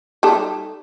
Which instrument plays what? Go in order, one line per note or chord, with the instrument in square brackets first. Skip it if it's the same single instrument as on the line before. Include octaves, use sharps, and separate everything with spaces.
[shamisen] G3 D#4 A4